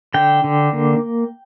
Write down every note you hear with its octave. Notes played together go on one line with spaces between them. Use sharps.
D3 G5
D3
A#3